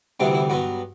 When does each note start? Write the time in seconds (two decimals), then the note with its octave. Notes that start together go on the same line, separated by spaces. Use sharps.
0.20 D2 C3 E3 G3 B3 D4
0.34 E4
0.50 G2 F#3 B3 F#4